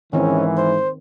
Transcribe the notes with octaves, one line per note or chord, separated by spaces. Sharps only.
G#2 D#3 E3 C4 C#4 D#4
C5